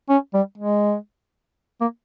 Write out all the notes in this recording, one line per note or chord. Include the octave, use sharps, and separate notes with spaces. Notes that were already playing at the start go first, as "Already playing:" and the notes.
C#4
G3
G#3
A#3